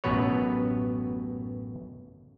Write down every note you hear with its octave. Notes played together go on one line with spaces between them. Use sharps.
A1 F#2 B2 B3 B4 C#5